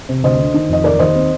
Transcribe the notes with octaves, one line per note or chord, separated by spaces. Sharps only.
C3
D2 C5 D#5
D3
D#3
F2 D#5
D#2 A#4 D5
D#2 C5 D#5
C4